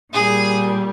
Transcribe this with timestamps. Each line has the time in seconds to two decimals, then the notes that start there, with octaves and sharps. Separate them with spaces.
0.13 A#2 G3 G#4